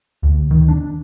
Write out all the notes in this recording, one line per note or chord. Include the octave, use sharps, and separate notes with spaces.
D2
D#3
D4